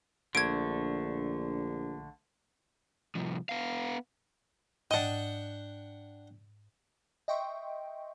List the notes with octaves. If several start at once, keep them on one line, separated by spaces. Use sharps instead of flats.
A#1 D3 A3 G#6 D7
C2 F3
B3 F5
G#2 D4 D#5 F#5 G5 A5
D#5 E5 G5 C6 C#6